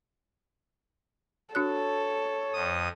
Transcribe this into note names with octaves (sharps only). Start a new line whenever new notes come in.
D4 F#4 A4 C#5 F#6
F2 D#6